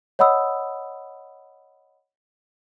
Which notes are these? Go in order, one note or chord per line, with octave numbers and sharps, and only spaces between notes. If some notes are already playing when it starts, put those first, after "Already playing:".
C#5 D#5 F#5 B5 D#6 E6